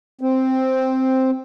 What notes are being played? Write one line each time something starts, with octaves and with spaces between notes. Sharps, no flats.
C4